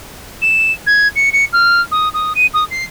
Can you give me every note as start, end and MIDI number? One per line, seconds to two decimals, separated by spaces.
0.42 0.72 100
0.86 1.08 92
1.15 1.29 97
1.33 1.45 97
1.53 1.81 89
1.91 2.09 87
2.13 2.33 87
2.35 2.46 99
2.53 2.64 87
2.71 2.84 96